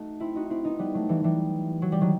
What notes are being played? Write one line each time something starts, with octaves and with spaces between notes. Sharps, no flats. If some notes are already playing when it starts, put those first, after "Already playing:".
Already playing: A3 D#4 F#4
C4 E4
D#4 F#4
C4 E4
B3 D#4
G3 B3
F#3 A3
E3 G3
E3 G3
F#3
G3
D#3 F#3